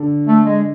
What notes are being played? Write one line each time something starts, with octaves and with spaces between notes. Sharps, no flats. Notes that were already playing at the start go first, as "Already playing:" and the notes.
Already playing: D3
A3
G#3